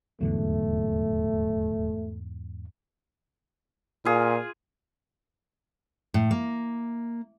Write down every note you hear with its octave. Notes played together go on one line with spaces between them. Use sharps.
D#1 E2 G#2 D3 F#3 A3
A#2 F4 G#4
A2
A#3